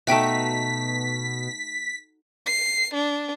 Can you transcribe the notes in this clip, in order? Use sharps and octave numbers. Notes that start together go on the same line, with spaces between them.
B2 A3 D#4 F#4 E5 G5 B6 D7
C7
D4